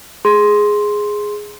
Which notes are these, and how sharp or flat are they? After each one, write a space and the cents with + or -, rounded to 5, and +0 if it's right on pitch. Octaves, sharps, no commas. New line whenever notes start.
G#4 +0 C6 +0